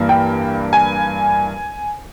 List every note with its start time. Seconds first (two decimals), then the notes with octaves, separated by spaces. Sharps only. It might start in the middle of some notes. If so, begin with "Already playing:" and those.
Already playing: G2 E3 A#3
0.09 G5
0.73 G#5